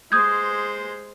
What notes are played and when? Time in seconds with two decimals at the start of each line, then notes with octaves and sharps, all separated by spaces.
0.12 G#3 C5 D#6 G6 G#6